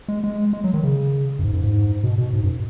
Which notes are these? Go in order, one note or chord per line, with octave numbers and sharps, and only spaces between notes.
G#3
G#3
G#3
F#3
D#3
C#3
F#2
G#2
F#2
G#2
B2
B2
G#2
F#2